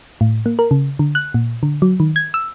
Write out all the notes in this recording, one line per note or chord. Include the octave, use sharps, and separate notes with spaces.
A2
A#3
A#4
C#3
D3
F#6
A#2
D3
F#3
D#3
G#6
E6